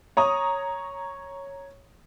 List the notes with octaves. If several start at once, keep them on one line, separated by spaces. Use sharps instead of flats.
C#5 A#5 D#6